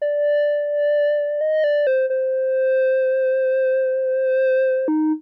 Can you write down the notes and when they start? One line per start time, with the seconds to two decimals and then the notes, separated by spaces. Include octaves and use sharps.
0.02 D5
1.41 D#5
1.64 D5
1.87 C5
2.10 C5
4.88 D#4